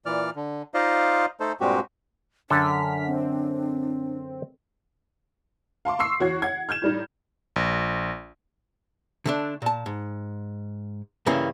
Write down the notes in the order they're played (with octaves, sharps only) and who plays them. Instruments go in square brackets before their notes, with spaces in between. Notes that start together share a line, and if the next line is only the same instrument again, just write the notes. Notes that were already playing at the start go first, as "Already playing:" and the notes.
[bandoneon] A#2 E3 D5 F6
D3
D#4 F4 C5 D5 D#5 F5
A3 D#4 A4 C5
G2 A#2 G#3 C4 F#4 G4
[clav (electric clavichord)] F#2 D3 A4 [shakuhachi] D4 [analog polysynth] F6 B6
[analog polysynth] C4
[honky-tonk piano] F5 A5 C6 D6
C6 C#6 E6 C7
E2 F#4 C#5 G#6
F#5 G#6
F6 G6 G#6 E7
A2 G3 D#4
[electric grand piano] A#1
[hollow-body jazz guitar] D3 A3 D4
A#2 A5
G#2
G2 C#3 E3 A#3 C#4